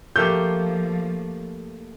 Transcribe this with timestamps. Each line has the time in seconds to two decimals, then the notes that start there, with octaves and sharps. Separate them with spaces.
0.16 F3 A3 A#3 G4 G6